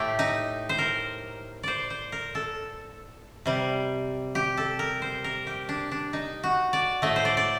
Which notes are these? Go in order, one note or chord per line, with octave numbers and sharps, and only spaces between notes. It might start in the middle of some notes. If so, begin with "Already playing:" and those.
Already playing: A2 A3 G4
D#4
C5
A#4
C5 D5
C5
A#4
A4
C3 G3
G4
A4
A#4
C5
A#4
G4
D4
D4
D#4
F#4
D5
A2 A3 D#5
C5
D5
D5